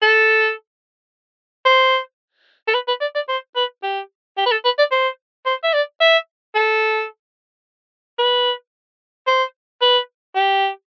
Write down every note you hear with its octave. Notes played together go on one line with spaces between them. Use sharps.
A4
C5
A4
B4
B4
D5
D5
C5
B4
G4
G4
B4
A4
B4
D5
C5
C5
E5
D5
E5
A4
B4
C5
B4
G4